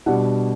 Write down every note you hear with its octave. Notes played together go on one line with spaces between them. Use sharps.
B2 G3 D4 F#5